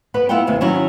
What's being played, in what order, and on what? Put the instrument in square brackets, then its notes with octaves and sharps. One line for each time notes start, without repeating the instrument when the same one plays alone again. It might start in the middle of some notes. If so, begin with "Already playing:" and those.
[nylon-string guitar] B3 B4
B3 E4 F4 F#5 G5
D#2 C3 E3
D#3 F#3 C#4 D#4 E4 F#4